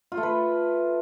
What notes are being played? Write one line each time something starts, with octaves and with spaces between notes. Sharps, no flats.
F4
A3
B4